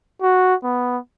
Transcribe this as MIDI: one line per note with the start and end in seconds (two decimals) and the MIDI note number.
0.22 0.55 66
0.64 0.98 59